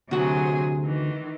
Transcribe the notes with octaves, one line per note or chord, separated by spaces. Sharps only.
D2 C3 F#3 F#4 G#4
D#3 E3